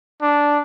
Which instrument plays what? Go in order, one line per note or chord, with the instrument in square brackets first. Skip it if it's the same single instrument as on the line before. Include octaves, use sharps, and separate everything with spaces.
[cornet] D4